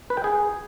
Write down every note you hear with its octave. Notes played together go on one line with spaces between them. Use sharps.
B4
G5
G#4